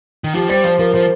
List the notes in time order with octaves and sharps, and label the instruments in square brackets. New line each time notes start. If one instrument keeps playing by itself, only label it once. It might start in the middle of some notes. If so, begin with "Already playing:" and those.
[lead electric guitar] D#3
[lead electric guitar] F3 [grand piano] G4
[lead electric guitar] G3 [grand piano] C5
[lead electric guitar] F3 [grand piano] C5
[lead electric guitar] F3 [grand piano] A#4
[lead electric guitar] F3 [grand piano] C5